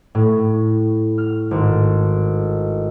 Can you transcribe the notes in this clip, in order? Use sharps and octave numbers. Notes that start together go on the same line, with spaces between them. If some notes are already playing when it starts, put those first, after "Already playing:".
A2
F6
G#1